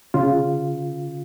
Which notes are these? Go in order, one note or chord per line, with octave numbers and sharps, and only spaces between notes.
C#3 F4